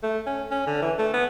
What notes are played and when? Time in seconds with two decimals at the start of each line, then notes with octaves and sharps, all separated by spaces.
0.03 A3
0.26 C#4
0.51 C#4
0.66 D3
0.82 E3
0.99 A3
1.14 B3